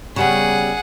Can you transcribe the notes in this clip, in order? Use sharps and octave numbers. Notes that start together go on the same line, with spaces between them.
C#3 G3 B3 G#4 F#5